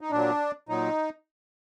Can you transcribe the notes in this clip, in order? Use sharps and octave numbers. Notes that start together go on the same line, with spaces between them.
D#4
A#2 F#3 D4
A#2 F#3 D#4